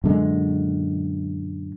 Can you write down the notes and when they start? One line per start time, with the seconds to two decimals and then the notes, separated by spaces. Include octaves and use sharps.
0.04 F#2 A#2 D3 G#3